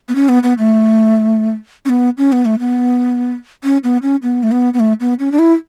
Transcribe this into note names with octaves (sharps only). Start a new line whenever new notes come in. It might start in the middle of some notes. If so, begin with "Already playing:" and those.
B3
C#4
B3
B3
A3
C#4
B3
C#4
B3
A3
B3
C#4
B3
C#4
B3
A3
B3
B3
A3
B3
C#4
D4
E4